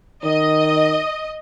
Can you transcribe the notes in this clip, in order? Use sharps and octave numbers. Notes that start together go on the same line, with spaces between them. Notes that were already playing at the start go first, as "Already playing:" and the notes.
D#3 D#5